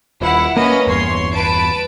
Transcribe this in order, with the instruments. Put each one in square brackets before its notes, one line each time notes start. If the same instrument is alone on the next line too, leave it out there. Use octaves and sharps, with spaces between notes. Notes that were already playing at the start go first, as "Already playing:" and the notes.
[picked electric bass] D#1 [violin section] E4 F#5
[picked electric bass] A#3 [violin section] C#4 B4 D#5
[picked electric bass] G1 E2 [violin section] C#5 C6
[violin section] B4 A5 D7